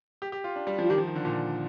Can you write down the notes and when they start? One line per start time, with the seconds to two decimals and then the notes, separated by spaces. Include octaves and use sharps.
0.22 G4
0.32 G4
0.44 F4
0.56 D4
0.67 G3
0.79 F3
0.83 F4
0.90 D#3 G4
0.98 F3
1.07 D#3
1.16 D3
1.25 A#2